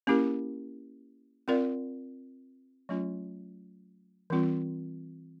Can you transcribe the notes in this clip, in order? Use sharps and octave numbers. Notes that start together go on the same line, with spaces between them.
A#3 C#4 E4 G4 A#4
C4 F4 A#4 D5 F5
F#3 A3 C#4 F4
E3 G3 C4 F4